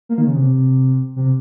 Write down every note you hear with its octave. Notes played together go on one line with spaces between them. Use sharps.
A#3
D#3
C#3
C3
C3